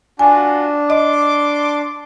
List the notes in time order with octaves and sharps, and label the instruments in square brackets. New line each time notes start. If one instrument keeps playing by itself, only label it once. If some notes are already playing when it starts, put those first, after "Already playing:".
[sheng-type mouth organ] D4 [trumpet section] F4 F#4 [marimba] G#5
[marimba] D#5 [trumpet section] C6 D6